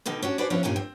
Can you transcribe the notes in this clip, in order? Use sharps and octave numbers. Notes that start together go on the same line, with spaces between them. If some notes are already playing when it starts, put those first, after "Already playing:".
B2 D3 D#3 D#4
C#4 D4 F#4
D4 F#4 G#4 B4 C5 D5
E3 F3 B3 C#4 D4 E4
G2 A#2 D#3 C#4 G#5
C4